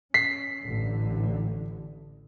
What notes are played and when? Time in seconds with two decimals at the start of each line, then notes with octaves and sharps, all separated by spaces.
0.14 C#4 B6 C7
0.65 A1 D3